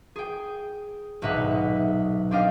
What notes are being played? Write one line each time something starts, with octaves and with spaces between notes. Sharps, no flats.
G#4 G5
D#1 B1 G#2 D#4 E5 F#5
C4 D4 G4 D#5 F5 G5